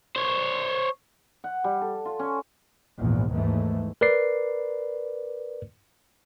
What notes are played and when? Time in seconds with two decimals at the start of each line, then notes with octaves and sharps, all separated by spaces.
0.16 C5 C#5
1.44 F#5
1.64 G3
1.81 A4
2.05 F4
2.19 C#4
2.99 A#1 E2 G#2
3.34 D#2 G#2 E3 A3
4.01 A#4 B4 D5 C7